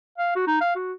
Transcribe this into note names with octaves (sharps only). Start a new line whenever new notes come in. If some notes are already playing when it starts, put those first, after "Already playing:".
F5
F#4
D#4
F5
F#4